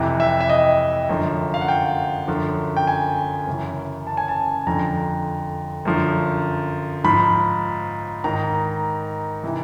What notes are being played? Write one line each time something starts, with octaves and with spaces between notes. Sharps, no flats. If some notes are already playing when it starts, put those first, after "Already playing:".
Already playing: F2 C3 E3
E5
E5
D#5
F#2 D3 F3
F5
F#5
G5
F#2 D3 F3
G5
G#5
F#2 C#3 E3
A5
G#5
A5
F2 D3 F3 A#5
F#2 D3 F3
G#2 F3 B5
G#2 D#3 A#5
C3 E3